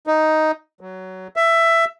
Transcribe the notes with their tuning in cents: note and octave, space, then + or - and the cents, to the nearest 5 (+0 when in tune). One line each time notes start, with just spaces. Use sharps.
D#4 +5
F#3 +15
E5 +15